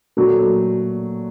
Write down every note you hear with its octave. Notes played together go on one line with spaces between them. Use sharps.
A#2 F#3 A3